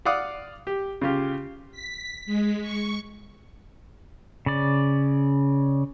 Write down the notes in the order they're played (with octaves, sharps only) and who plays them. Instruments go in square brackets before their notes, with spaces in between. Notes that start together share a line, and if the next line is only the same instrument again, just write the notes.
[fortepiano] D5 F5 F#5 D6 D#6
G4
C#3 F4 G4
[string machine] B6
G#3
C#6
[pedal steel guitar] C#3 D5